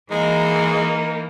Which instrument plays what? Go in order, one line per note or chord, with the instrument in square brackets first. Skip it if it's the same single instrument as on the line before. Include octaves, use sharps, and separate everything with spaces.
[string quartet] E3 A#3 [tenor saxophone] G#3 [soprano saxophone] D#4